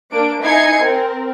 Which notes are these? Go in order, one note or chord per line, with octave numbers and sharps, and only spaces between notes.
A#3 D4 D7
D#4 E4 G#5 G#6 C7 C#7
C4 A#4